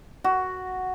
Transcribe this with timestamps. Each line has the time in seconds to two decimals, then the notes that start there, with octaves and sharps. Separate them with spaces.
0.24 F#4